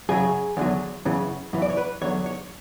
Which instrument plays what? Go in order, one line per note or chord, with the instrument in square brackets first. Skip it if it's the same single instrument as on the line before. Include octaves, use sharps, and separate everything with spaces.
[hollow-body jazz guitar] F#2 C#3 F#3 G#4
E2 D3 F#3
F#2 C#3 E3
F#2 E3
D5
C#5
B4
E2 D3 F#3 C#5
C#5